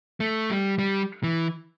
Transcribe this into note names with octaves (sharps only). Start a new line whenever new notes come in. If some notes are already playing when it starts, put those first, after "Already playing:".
A3
G3
G3
E3